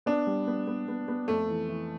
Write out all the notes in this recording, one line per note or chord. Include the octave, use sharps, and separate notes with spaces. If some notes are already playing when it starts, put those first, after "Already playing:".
B3 D4
G3
B3
B3
B3
B3
F2 A3
E3
E3